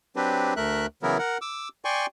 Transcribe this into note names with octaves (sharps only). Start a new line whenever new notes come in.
F#3 C4 D4 G4 B4
D2 A3 A#4 E5 F#6
C#3 E3 F#3 B3 E4 A#4
A#4 F#5
D6 E6
D5 G5 G#5 C6 C#6